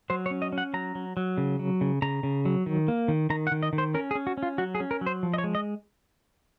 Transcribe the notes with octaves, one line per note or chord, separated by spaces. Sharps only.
F#3 C5
C#5
C#4
D#5
C#4
F#5
F#3 A#5
F#3
F#3
C#3
F#3
C#3
C#3 A#5
C#3
F#3
D#3
A#3
D#3
D#3 A#5
F#5
D#3
D#5
D#3
C5
C#4 A#4
G#4
C#4
F#4
C#4
F4
F#3 F#4
G#4
C#4
A#4
F#3
C5
F3
D#5
C#5
G#3
D#5